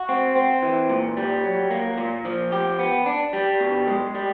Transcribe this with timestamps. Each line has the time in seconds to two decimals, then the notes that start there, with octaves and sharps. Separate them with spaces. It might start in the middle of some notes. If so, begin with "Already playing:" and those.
Already playing: F#4
0.09 C4
0.35 C4
0.62 E3
0.89 A#2
1.17 G3
1.44 F#3
1.71 A#3
1.98 A#2
2.25 F3
2.52 G4
2.79 B3
3.06 D4
3.33 G3
3.60 B2
3.87 G#3
4.14 G3